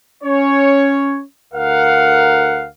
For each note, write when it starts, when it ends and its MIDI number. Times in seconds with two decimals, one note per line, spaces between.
0.24 1.22 61
0.24 1.22 73
1.54 2.68 38
1.54 2.68 70
1.54 2.68 77
1.54 2.68 78